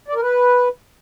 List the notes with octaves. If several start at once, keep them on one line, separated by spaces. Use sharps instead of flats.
D5
A#4
B4